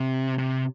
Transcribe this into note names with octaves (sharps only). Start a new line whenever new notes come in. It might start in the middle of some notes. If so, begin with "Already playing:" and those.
Already playing: C3
C3